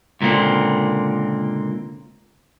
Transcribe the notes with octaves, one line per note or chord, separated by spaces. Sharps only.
C#2 A#2 D3 A#3 C4